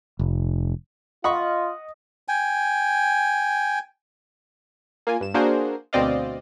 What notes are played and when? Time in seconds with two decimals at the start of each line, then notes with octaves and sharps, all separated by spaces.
0.19 F1
1.24 F4 D#5 F#5 B5 C#6
2.28 G5 G#5
5.07 A#3 F4 G#5
5.20 G2 E7
5.34 A#3 D4 F#4 G#4 A#4 C5
5.93 D2 B2 C4 D5 D#5 F5